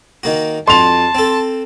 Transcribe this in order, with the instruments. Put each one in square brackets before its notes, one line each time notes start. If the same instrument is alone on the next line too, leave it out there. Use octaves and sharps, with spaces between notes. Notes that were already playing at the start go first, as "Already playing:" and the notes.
[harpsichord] D#3 A#3 F#4
[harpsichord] F2 F#4 [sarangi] A5 [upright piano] C6 F7
[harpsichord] C4 A4